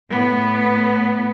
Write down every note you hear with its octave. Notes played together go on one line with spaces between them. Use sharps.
A2 B3